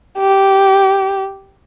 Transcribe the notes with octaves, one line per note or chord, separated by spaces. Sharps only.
G4